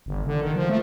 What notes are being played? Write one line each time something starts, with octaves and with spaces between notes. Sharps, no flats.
G1
D3
D#3
F3
A3